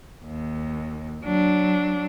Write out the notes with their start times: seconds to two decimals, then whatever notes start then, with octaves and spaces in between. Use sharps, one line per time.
0.24 D#2
1.24 F#3 D4